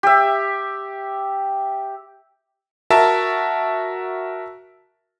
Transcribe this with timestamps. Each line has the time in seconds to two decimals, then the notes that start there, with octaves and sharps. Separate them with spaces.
0.03 G4 E5
2.90 F#4 A#4 E5 A5